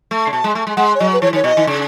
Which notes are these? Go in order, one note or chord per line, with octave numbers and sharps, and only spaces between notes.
A3
C#3
B2 A5
G#3
A3
G#3
G#3 F#5
C#5
F#3 D#5
B4
E3 C#5
D#3 C#5
B2 D#5
D#3
C#3